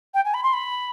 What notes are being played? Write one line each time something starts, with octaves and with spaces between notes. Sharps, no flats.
G5
G#5
B5
C6
B5